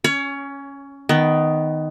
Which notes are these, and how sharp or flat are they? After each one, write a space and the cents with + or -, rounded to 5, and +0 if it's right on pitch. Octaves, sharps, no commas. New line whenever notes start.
C#4 +0 C#5 +25
D#3 +0 B3 +15